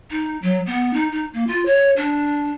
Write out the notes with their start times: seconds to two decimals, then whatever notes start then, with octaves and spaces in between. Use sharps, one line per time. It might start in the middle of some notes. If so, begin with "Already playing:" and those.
0.11 D#4
0.42 F#3
0.66 B3
0.94 D#4
1.11 D#4
1.33 A#3
1.47 F4
1.66 C#5
1.97 D4